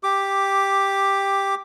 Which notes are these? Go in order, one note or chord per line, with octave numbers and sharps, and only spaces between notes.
G4 D6